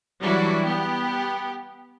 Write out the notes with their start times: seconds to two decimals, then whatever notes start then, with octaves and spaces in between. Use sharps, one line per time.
0.21 E3 F#3 G3 D4 E4 F#4
0.64 B3 G4